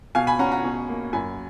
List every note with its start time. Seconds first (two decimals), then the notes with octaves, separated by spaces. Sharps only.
0.15 B2 F5 G#5
0.27 G#5 B5
0.39 C#4 F#5 A#5
0.52 F#5 A#5
0.64 B2
0.89 A#3
1.13 F#2 G#5 B5